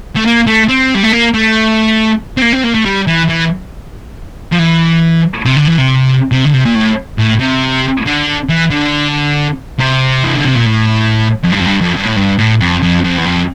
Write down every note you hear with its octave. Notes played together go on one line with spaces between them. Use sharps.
A3
A#3
A3
C4
G3
A3
A#3
A3
C4
A#3
C4
A#3
A3
G3
E3
E3
F3
E3
C3
D3
E3
C3
C3
D3
C3
A#2
A2
A2
C3
D3
E3
D3
C3
E3
D3
C3
A#2
A2
F2
G2
F2
G2
F2
G2
A2
G2
A2
F2
F2
F2
E2
F2